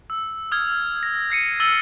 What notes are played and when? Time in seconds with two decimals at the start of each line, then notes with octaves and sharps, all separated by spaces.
0.10 E6
0.52 D#6 F6 G#6
1.03 A#6
1.30 G#6 C7 C#7 D#7
1.60 E6 A6 D#7 F#7 G7